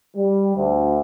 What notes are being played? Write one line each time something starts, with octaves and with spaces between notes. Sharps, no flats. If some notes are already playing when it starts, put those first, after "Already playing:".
G3
D2